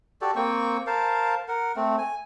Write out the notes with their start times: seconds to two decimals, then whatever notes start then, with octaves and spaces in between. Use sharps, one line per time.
0.21 F#4 G4 A4 D5
0.36 A#3 C4 G5 C#6
0.87 A#4 C5 F5 A5
1.48 A#4 F#5
1.76 A3 C4
1.98 G#5